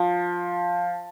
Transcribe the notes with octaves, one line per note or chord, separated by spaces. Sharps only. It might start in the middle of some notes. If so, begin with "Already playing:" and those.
Already playing: F3